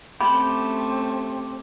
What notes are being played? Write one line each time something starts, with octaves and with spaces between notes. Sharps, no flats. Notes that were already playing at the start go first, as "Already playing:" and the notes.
A3 C4 C#4 G4 C5 B5